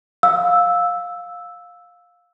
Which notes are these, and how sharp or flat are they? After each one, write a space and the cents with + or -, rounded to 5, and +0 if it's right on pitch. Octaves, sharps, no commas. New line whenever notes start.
F5 +15 E6 +0